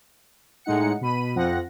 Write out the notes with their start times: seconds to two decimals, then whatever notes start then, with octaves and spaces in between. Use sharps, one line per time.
0.65 A2 G#3 D#4 F#5 C#7
1.01 B2 B5 D#7
1.35 F2 F3 C4 F#5 A#6